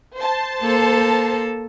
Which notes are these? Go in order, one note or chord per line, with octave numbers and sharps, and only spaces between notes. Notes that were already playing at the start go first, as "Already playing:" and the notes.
C5 A5
A#3 A4